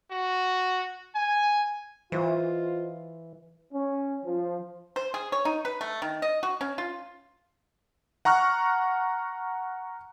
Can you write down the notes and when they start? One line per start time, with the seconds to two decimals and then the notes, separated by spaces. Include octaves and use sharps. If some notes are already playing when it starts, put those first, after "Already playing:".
0.11 F#4
1.15 G#5
2.12 E3 F4 C5 D#5
3.73 C#4
4.25 F3
4.96 C5
5.14 G#4
5.32 C#5
5.45 D#4
5.65 B4
5.81 A3
6.02 D#3
6.22 D#5
6.43 F#4
6.61 C#4
6.78 F4
8.25 F#5 A#5 C#6 F6 F#6